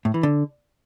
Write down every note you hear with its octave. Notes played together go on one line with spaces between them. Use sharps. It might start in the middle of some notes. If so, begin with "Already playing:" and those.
A2
E3
D3